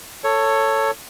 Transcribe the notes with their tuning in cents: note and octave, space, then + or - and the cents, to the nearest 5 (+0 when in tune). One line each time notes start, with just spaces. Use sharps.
A4 +15 C#5 +0